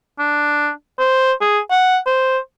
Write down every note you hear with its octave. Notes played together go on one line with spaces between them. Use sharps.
D4
C5
G#4
F#5
C5